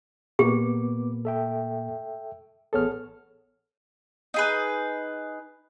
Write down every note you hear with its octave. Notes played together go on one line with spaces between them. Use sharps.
A#2 A#3 B3 G4 B4 D6
A4 E5 G5
A1 B3 G#4 A4 C#5 F6
D#4 G#4 B4